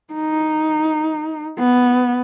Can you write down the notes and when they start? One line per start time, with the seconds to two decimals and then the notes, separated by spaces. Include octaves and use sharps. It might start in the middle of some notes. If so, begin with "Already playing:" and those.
0.13 D#4
1.59 B3